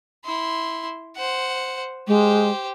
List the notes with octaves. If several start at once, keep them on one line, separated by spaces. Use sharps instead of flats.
E4 C6
C5 F#5
G#3 G4 C5